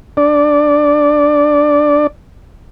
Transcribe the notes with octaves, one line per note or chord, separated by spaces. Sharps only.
D4 D5